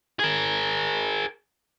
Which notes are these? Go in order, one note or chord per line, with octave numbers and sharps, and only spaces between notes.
G#4 A#4